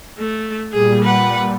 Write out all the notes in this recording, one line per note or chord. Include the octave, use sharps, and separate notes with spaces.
A3
A#2 G3 G#4
B4 F#5